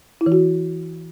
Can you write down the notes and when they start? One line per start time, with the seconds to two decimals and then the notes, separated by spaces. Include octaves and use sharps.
0.21 E4
0.26 E3
0.32 F#4